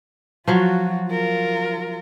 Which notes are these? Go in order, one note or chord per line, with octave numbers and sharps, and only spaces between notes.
F3 F#3 F4 F#4
F4 A#4